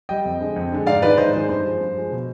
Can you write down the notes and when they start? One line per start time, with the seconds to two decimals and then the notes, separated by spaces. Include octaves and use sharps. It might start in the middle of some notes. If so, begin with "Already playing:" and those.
0.09 G3 D#5 G5
0.25 F2
0.40 D3 G#3
0.56 F2
0.72 D3 G#3
0.86 G#2 D5 F5
1.02 D#3 G#3 B4 D5
1.17 G#2 C5 D#5
1.33 D#3 G#3 C5
1.49 G2 C5
1.64 F3 G#3
1.81 G2
1.95 F3 G#3
2.11 B2